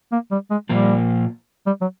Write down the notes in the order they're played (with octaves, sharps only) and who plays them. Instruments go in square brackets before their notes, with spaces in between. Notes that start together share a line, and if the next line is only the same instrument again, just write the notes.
[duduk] A#3
G3
G#3
[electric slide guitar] A#2 F3 A#3 [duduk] G3
[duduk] G3
F#3